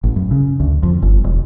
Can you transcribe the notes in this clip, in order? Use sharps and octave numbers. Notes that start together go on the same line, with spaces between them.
A1
F#2
C#3
D2
F2
G1
E1